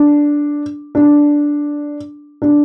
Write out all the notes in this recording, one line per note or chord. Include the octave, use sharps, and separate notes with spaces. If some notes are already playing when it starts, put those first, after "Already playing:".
Already playing: D4
D4
D4